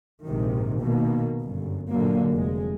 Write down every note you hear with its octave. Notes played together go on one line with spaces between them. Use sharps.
A#1 G#2 C3 D#3
B2 D#3 A#3
G1 F#2
A#2 D3 F#3 A#3
F1 G#3